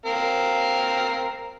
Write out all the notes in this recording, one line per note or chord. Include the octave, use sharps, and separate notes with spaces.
C4 A#4 F5